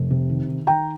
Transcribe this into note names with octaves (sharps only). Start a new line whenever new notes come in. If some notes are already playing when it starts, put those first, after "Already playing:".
Already playing: F1
C3
D#3
D#3
D#3 G5 A#5